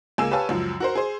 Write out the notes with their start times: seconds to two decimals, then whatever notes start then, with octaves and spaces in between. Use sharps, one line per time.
0.18 C#2 A#3 G#4 G#5 E6 E7
0.31 G4 B4 C#5 F5 G#5 A5
0.49 C#2 F#2 F3
0.80 F#4 A#4 C5
0.95 G#4 C5